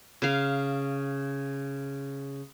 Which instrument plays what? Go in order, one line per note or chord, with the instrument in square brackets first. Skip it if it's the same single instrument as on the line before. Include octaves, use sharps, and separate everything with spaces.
[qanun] C#3 F5